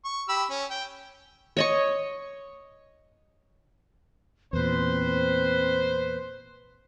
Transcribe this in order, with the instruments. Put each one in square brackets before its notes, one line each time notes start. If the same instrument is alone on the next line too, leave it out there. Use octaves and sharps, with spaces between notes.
[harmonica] C#6
G4 B5 E6
C#4
G5
[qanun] C#5 D#5 C#6
[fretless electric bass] E2 A#2 [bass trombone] C4 [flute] B4 [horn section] C5